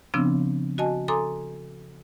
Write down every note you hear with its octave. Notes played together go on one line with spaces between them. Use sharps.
C#3 F3 B3 C4 D4 E6
F#4 D#5 G#5 A5
A4 G#5 A#5 C6 D6 D#6